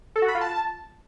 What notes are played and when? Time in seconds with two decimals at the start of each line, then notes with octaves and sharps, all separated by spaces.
0.16 A4
0.22 F#4
0.28 B5
0.35 F4
0.41 A5